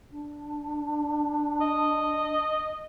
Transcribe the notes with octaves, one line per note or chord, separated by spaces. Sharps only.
D4
D#5